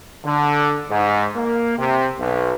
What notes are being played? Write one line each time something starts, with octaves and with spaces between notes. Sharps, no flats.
D3
G#2
A#3
C3
B1